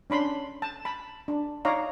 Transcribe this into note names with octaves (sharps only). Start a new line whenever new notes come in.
C#4 D4 B5 C6
A5
A5 B5
D4
D#4 C#5 D5 F5 A#5